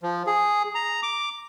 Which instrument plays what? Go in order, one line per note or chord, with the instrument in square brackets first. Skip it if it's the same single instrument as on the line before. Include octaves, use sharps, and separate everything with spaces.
[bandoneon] F3
G#4
A#5
D6